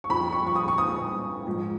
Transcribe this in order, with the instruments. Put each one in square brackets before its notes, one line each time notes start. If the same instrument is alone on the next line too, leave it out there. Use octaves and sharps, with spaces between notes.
[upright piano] C#6
F2 F3 B5
C#6
C#6
D#6
C#6
D#6
G#2 F3